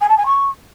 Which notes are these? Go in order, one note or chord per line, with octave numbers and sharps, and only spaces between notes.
G#5
A5
G#5
C#6